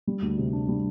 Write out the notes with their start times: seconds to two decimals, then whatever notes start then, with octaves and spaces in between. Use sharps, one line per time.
0.07 G3
0.22 D2
0.38 C3
0.53 D4
0.68 G3